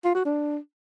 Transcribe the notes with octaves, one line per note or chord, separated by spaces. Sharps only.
F4
F#4
D4